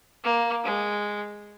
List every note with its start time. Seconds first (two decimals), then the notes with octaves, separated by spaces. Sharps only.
0.24 A#3
0.64 G#3